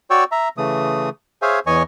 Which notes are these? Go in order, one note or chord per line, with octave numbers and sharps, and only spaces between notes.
F#4 C#5 D5 G5 C#6 E6
E5 A#5
C#3 E3 A3 D#6
G#4 C5 C#5 E5 F5 G#5
E2 E3 C#5 D#5 G#5 C#6